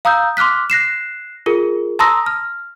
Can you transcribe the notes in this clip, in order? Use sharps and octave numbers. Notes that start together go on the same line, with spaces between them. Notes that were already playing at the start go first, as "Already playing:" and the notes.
F5 A#5 D#6 E6 G6
C6 D6 F6 F#6 B6
F#6 A#6 C7 E7
F4 G#4 A#4
A5 A#5 C6 D#6 E6 A#6
F6